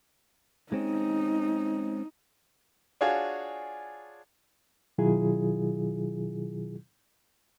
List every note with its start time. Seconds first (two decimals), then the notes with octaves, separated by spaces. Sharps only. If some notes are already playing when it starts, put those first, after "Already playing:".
0.72 G#3 C4 C#4 D#4
3.01 D4 F4 F#4 G#4 C#5 F5
4.98 B2 D#3 F#3 E4 F4 G#4